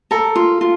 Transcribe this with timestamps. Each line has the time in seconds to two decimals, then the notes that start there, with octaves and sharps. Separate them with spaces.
0.11 A4 A#4
0.36 F4
0.61 F4